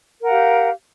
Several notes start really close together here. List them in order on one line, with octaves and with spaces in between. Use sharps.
A#4 F#5 F5 G4